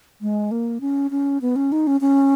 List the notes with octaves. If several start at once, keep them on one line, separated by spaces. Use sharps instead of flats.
G#3
A#3
C#4
C#4
B3
C#4
D#4
C#4
C#4